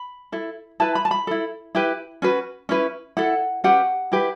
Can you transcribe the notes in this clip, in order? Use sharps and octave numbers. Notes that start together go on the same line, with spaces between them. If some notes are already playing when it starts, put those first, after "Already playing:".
Already playing: B5
E4 A4
E4 B4 A5
B5
A5
B5
E4 A4
E4 G4 B4
C#4 F#4 B4
C#4 E4 B4
E4 A4 F#5
C#4 G4 B4 F#5
E4 G4 B4